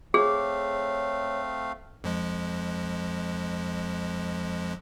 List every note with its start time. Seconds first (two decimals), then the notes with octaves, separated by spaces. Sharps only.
0.14 A3 C4 G#4 C#5 F5
2.04 F2 F3 G#3